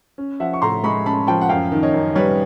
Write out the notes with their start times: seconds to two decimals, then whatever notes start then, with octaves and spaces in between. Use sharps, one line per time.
0.18 C#4
0.40 F3 E5 F#5
0.53 C#6
0.62 A2 A#5 C6
0.84 G#3 B5 C#6
1.06 C#4 A5 B5
1.27 F3 G5 A5
1.41 F#5
1.49 F#2 F5 G5
1.72 D#3
1.83 C#5 D#5
1.94 F#2
2.15 G3 B4 C#5